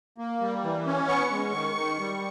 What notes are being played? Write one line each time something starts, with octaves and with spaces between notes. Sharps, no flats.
A#3
G3
E3
C#4
B3 C#6
G#3
D#3
D#3
G3